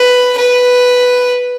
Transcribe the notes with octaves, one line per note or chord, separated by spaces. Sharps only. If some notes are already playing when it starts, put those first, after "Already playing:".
Already playing: B4
B4